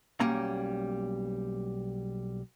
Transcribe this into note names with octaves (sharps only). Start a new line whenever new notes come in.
B1 G3 A#3 C#4 A#5